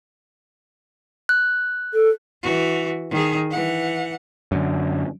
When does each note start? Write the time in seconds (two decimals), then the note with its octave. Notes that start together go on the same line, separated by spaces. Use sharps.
1.29 F#6
1.94 A4
2.43 E3 F#4
3.10 D#3 G#4
3.50 E3 F#5
4.52 F#2 D3